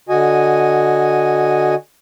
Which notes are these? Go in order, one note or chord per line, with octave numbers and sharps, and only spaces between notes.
D3 F#4 D#5 G#5